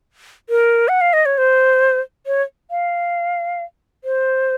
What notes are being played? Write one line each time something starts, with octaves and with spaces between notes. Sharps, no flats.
A#4
F#5
F5
D#5
C#5
C5
C#5
F5
C5